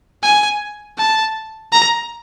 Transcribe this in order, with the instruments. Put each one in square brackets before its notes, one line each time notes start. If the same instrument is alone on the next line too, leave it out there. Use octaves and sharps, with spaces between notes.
[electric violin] G#5
A5
A#5